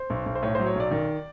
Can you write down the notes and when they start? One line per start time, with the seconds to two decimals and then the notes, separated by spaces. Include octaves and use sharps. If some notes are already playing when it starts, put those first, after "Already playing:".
Already playing: C5
0.10 B1
0.26 B1
0.35 C5
0.43 A2 C#5
0.55 F#3 C5
0.67 C#5
0.75 B1 D5
0.91 D#3